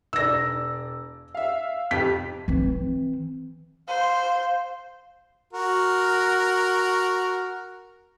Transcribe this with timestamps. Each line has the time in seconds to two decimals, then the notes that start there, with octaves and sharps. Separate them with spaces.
0.13 E1 D5 E6 A#6
1.35 E5 F5
1.91 F2 C3 B6
2.48 E3 C4
3.88 C5 F5
5.53 F#4 A#4